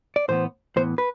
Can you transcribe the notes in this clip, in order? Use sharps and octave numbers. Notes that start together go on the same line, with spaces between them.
D5
A2 E3 B3 C5
A2 E3 B3 C5
B4